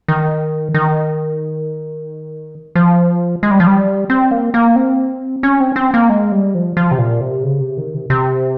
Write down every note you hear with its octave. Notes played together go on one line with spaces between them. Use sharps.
D#3
D#3
F3
G#3
G3
F3
G3
C4
A#3
A#3
C4
C#4
C4
C4
A#3
G#3
G3
F3
F3
C3
A#2
C3
C#3
C3
D#3
C3
C3